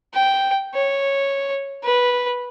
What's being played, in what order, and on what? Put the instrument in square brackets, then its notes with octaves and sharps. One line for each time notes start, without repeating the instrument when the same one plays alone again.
[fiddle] G5
C#5
B4